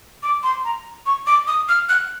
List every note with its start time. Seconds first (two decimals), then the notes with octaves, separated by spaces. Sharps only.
0.23 D6
0.43 C6
0.65 A#5
1.06 C#6
1.27 D6
1.47 D#6
1.69 F6
1.89 F#6